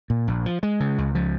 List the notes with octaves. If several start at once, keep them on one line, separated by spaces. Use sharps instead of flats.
A#2
A#1
F3
G#3
C#3
C#2
F3